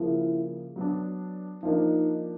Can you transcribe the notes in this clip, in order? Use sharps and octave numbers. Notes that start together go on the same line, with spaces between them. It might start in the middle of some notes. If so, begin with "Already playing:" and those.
Already playing: C#3 F3 A#3 E4
F#3 B3 D4
F3 A#3 D4 D#4